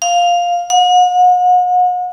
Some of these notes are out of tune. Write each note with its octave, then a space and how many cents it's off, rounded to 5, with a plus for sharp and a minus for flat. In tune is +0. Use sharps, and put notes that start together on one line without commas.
F5 +5
F#5 -40